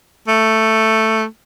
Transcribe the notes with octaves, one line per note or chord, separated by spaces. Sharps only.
A3